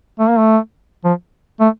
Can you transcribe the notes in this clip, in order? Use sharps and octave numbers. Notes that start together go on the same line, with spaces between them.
A3
A#3
A3
F3
A3